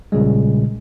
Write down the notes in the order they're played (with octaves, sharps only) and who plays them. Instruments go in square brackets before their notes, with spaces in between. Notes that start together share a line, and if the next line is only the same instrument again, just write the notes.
[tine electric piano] A#1 A#2 C#3 G3 G#3